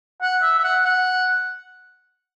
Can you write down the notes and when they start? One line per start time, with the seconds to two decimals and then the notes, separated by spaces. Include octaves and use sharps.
0.22 F#5
0.42 E5
0.59 E5
0.64 F#5
0.84 F#5